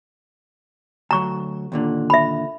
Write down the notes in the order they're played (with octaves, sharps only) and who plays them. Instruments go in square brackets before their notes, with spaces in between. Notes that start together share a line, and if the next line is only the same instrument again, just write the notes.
[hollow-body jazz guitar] D2 F#3 [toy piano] A#5 C#6
[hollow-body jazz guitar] D#2 A#2 D3
[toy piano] E5 B5